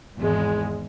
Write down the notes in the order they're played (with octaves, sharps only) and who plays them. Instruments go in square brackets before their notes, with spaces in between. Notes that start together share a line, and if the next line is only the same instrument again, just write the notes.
[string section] G#1 E2 G#3